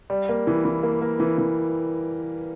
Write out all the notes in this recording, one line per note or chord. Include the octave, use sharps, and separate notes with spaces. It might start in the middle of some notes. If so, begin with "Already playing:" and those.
G3
A#3
E3
E3
A#3
A#3
E3
E3